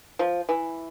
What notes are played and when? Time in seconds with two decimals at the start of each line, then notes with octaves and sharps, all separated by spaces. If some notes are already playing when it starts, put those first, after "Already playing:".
0.19 F3
0.49 E3